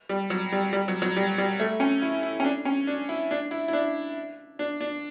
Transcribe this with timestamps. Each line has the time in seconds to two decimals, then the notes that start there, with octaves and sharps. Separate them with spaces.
0.09 G3
0.30 F#3
0.52 G3
0.73 G3
0.88 F#3
1.02 F#3
1.17 G3
1.38 G3
1.60 A3
1.80 C#4
2.02 E4
2.23 E4
2.40 C#4
2.44 D4
2.65 C#4
2.87 D4
3.09 E4
3.31 D4
3.51 E4
3.68 E4
3.73 D4
4.59 D4
4.81 D4